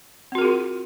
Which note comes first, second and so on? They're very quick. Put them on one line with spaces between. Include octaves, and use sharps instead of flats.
C4 F#4 A#4 G#4 F4